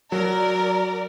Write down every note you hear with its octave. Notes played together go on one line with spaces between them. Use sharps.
F#3 A#4 D5